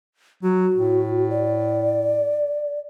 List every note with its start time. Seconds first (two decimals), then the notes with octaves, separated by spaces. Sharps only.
0.43 F#3 F#4
0.76 A2
1.30 D5